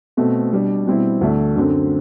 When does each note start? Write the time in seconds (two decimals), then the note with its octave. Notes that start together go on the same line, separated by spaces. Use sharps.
0.17 B2 A3 C4
0.52 B2 G3 D4
0.87 B2 G3 C4 E4
1.21 D2 D3 A3 D4
1.56 F#2 D3 F#3 C4